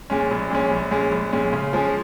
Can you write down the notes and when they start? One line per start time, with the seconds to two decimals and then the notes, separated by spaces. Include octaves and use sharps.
0.10 A#2 G#3 C#4
0.31 A#1
0.50 A#2 G#3 C#4
0.71 A#1
0.91 A#2 G#3 C#4
1.12 A#1
1.33 A#2 G#3 C#4
1.53 C#3
1.73 F3 G#3 C#4